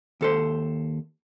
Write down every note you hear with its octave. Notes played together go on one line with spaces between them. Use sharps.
D#2 A4 C5